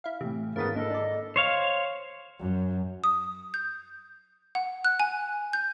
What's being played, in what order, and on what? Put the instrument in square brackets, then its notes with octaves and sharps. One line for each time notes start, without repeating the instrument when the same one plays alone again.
[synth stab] E4 F5
[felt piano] A2 E3 [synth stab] C3
[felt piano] G#1 E4 B6 [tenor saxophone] C#3 [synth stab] A#3 B3 [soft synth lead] A6
[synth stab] D3 A#3 [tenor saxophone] A4 [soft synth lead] D#5
[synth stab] D4 D5
[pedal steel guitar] C5 C#5 F5
[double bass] F#2
[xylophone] D#6
G6
F#5
F#6
G#5
G6